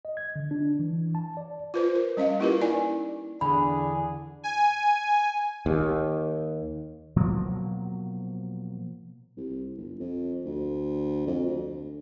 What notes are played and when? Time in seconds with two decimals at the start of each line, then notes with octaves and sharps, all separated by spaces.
0.05 D#5
0.17 G#6
0.36 D3
0.51 D4
0.79 E3
1.15 A5
1.37 D5
1.74 F4 B4 C5
1.95 A#4
2.17 G3 C#4 D#5 F5
2.40 A#3 E4 F4 G4 A#4 B4
2.61 D#4 E4 D5 G#5
3.41 E2 D3 D4 G#4 B5
4.43 G#5
5.66 D#2
7.16 B2 F3 F#3 A#3
9.37 C2
9.77 G1
9.99 F2
10.45 D2
11.27 F2
11.46 D2